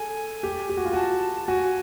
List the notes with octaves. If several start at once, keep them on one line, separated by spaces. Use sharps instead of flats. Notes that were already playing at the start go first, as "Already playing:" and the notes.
Already playing: G#4 A4 G#5
G4
G4
F#4
F4
F#4 A5
A5
F#4 G#5